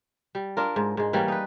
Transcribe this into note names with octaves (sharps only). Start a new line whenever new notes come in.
G3
D4 F4 A#4
G#2
G#2 G#3
E3 G3 A#3 C#4
D#4 B4